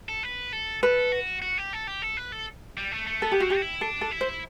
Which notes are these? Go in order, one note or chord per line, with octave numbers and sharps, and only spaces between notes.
A4
B4
A4
A4 B4
F#4
F#4
G4
A4
G4
A4
B4
A4
G3
A3
A3
B3 A4
G4
C4 F#4
G4
F#4
E4
D4 A4
A4
E4
C5